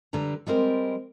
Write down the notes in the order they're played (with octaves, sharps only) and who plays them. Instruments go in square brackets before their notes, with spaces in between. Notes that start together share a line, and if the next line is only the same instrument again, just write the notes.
[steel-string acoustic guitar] D3 G3 B4 A#5
G3 G#3 C4 A#4